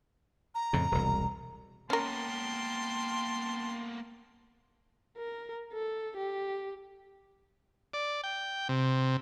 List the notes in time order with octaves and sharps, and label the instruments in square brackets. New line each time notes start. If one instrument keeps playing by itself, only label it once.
[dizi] A#5
[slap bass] F2 A2 C#3
E1 C2
[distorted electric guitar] A#3 B3 [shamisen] C#4 A#4 [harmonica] G5 A5 C6
[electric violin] A#4
A4
G4
[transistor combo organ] D5
G5
C3